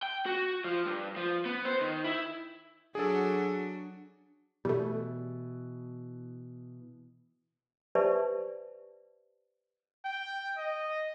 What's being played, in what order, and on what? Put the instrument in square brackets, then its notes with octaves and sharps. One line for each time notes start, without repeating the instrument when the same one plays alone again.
[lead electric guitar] G5
F#4
F3
G2
F3
B3
C5
D#3
E4
[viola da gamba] F#3 D4 F#4 [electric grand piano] G#4 A4
[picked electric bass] B2 E3 [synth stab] G3 A3
[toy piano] G4 B4 C5 D5 E5 A5
[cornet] G5
D#5